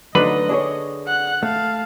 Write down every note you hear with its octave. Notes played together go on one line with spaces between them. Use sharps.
D3 F#3 A3 D#4 B4 D#5
D4 G#4 C#5
F#5 F#6
A3 F5 A5